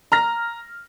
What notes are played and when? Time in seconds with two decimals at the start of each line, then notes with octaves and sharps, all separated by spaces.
0.12 A#5 F6 A#6